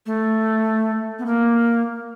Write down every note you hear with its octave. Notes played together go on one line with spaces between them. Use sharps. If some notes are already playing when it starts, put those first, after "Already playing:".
A3
B3
A#3